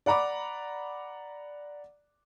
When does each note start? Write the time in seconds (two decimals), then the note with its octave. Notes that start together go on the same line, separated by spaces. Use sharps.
0.06 D5 F#5 A#5 B5 D6